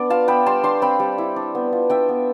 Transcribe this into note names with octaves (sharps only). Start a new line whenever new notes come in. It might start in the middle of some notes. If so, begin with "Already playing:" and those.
Already playing: B3 D4 D5
F4 F5 A5
B3 G5 B5
G3 A5 C6
D4 A5 C6
C4 G5 B5
G3
E4
D4
B3
F4
D4 E5 G5
B3